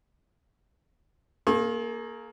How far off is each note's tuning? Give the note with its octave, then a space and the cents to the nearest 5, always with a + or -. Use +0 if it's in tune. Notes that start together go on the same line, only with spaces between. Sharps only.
A#3 +0 G#4 +45 C#6 -45